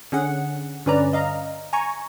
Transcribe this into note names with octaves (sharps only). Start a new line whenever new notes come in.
D3 C#4 G#4 F#5
G2 D3 C#4 B4 D5 A#5
D#5 F5 A#5
G#5 A#5 C#6